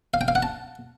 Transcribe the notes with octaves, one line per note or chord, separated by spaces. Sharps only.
F5
G5
F5
F#5
A5